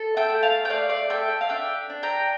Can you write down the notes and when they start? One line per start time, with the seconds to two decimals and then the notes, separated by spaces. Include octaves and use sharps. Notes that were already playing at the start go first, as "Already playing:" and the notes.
Already playing: A4
0.17 E5 G5
0.30 A3
0.43 F5 A5
0.65 G5
0.70 A3 D5 F5
0.89 D5 F5
1.09 A4 E5 G5
1.41 F5
1.49 D4 E5 G5
1.90 D4
2.03 G5 A#5